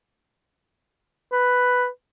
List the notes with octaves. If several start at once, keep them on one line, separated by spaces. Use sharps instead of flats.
B4